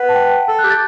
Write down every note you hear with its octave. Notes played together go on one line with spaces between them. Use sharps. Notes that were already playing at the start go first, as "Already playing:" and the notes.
Already playing: B4 F#5
A5
G5
A4 A5
F#6
G4 G6
A6